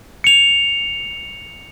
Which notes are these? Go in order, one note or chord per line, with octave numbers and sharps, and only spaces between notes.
C#7 F7